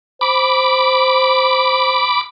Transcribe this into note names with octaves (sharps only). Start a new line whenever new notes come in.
C5 B5 D6